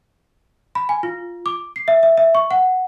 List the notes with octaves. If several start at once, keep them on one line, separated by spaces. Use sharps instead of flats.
B5
G#5
F4
D6
C7
E5
E5
E5
C#6
F#5